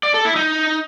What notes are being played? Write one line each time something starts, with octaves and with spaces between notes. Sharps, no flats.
D5
A4
E4
D#4